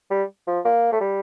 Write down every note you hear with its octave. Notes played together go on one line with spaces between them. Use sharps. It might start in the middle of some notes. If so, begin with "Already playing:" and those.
G3
F3
A#3
A3
G3